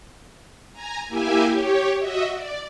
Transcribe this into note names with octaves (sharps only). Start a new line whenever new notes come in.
G#5 A#5
A#3 E4 G4 E5 G#5
G4 C#5
F#4 D#5 E5
D5